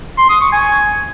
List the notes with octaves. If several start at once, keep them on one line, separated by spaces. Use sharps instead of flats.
C6
D#6
C#6
G#5